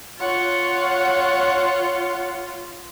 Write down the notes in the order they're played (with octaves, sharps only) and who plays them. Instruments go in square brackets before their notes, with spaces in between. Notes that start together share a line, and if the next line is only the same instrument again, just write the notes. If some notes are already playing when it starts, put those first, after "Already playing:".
[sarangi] F4 [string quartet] C#5 F#5